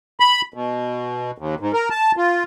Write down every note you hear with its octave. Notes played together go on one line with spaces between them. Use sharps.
B5
B2
D#2
G#2
A#4
A5
F4